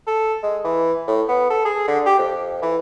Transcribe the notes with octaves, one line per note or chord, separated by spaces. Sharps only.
A4
G#3
E3
A2
B3
A4
G#4
D3
G4
F2
E3